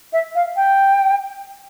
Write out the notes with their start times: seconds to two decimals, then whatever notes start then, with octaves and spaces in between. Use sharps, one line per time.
0.13 E5
0.35 F5
0.56 G5